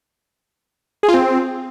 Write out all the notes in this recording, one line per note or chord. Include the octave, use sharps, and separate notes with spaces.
G#4
F4
C4